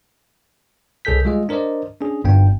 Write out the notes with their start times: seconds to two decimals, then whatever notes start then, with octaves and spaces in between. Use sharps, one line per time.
1.05 C2 G#4 A4 G6 B6
1.25 G3 G#3 F4 G#4 D#5
1.49 D4 A#4 C5 D5 D#5
2.01 C#4 D4 G#4
2.24 G1 G2 B3 D4 G5